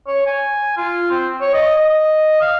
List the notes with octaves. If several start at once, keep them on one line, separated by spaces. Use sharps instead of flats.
C#5
G#5
F4
C4
C#5
D#5
D#5
F5